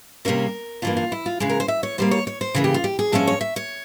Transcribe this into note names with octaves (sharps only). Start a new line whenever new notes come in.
C3 G3 A#3 C#4 A#4
G2 E3 A#3 F4
F4
E4
F4
C#3 E3 G#3 G#4
A#4
C5
E5
C#5
G#2 G3 A#3 C5
C#5
C#5
C5
C#3 E3 A#3 G#4
G4
F4
G4
G#4
G2 F3 G#3 C#4 E5
C#5
E5
C#5